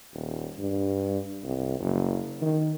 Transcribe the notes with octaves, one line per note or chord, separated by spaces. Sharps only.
D#1
G2
C2
F#1
D#3